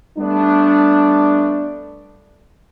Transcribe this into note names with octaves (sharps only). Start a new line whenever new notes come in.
G3 A3 B3 D4